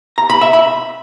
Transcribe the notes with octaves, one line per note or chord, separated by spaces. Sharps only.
A#5
B5
E5
B5